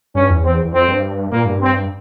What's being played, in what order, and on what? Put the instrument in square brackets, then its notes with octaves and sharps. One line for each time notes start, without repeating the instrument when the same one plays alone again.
[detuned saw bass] G2 [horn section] C#4
[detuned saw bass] E2
[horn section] C4
[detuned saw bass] E2
[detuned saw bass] F2 [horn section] C4
[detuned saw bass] G2
[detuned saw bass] A#2 [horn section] A#3
[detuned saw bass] G2
[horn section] C4